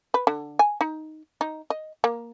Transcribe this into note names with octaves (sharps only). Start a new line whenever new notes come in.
B4
D3
G#5
D#4
D#4
D#5
A#3